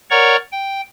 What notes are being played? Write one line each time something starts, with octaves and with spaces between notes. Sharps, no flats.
A#4 C#5 D5 F#5 A#5 C#6
G5